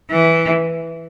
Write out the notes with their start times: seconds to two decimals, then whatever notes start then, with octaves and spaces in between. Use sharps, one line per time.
0.11 E3